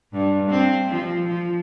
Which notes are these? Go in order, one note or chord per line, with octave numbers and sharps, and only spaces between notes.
G2
C4
F3
F3